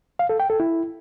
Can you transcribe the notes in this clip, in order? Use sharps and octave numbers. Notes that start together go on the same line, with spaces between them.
F5
A4
G5
A4
E4